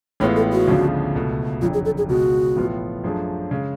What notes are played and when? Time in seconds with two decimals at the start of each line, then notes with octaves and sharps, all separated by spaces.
0.20 A1 A2 G#3 B3 F4 C#5
0.36 A4
0.53 F#4
0.67 D2 C#3 F3 B3 D4
1.15 C#2 B2 A3
1.62 F#1 F2 D3 F#3 F4
1.74 G#4
1.85 A4
1.98 G#4
2.09 C#2 B2 G#3 F#4
2.56 A1 A2 F3 B3 F4
3.04 F#2 F3 A3 D4 G#4
3.51 C#3 G#3